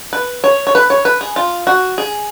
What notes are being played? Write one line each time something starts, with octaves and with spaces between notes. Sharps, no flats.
B4
C#5
C#5
B4
C#5
B4
G#4
F4
F#4
G#4